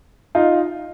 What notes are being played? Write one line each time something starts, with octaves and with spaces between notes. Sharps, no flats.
D#4 F4